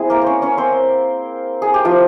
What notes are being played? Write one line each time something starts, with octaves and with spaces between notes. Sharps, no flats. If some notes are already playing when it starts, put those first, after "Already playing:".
Already playing: C4 E4 G#4
A#3 A#4
C#4 C5 C#5
C#4 C#5
C4 C5
G#4
G4
F3 F4